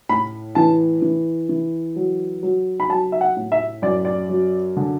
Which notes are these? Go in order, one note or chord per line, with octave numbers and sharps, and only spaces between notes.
A2 B5
E3 A5
E3
E3
F#3
F#3
B5
F#3 A5
E5
F#5
A2
E5
F#2 D5
D5
F#3
D3